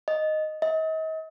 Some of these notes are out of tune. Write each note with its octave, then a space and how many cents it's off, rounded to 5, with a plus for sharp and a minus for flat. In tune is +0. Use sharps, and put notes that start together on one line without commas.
D#5 -5
D#5 +40